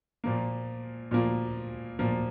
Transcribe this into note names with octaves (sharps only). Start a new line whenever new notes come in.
A#2 F3 A#3
A#2 F3 A#3
A#2 F3 A#3